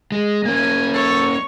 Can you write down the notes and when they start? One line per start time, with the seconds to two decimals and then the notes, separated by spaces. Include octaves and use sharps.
0.12 G#3
0.46 A#3 C#4 G#5
0.94 A4 C#5